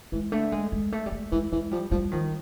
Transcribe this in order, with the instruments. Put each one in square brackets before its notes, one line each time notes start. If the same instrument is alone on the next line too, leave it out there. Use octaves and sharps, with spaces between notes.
[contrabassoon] E3 [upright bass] G#3
[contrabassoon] D3 [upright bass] A3
[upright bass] G#3
G#3
A3
G3
G#3
[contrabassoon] E3 [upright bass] G#3
[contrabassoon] E3 [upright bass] G#3
[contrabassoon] F3 [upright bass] G3
[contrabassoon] F3 [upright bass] G3
[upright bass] D#3 [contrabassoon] F3